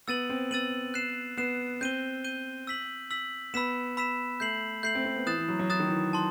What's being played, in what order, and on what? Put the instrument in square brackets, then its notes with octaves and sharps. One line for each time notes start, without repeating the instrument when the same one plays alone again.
[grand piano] B3 [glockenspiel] E6 A6 D#7 F#7
[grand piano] C4
[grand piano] B3 [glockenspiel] E6 A6 D#7 F#7
[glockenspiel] F#6 C7 E7
[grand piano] B3 [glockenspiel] F#6 C7 E7
[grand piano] C4 [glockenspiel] G6 D#7 G7
[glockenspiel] G6 D#7 G7
E6 B6 F#7
E6 B6 F#7
[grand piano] B3 [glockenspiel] B5 E6 B6 E7
[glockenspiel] B5 E6 B6 E7
[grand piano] A3 [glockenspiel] G6 C7 F#7
[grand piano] A3 [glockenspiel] G6 C7 F#7
[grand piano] C4
C4
B3
[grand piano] E3 [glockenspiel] D#6 F#6 A6 E7
[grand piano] E3
F#3
F#3
[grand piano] E3 [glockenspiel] D#6 F#6 A6 E7
[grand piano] D#3
E3
[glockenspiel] A5 C6